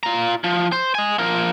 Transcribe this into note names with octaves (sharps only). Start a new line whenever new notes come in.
F4 A#5
F3
C5
D#5 G#5
F3 A#4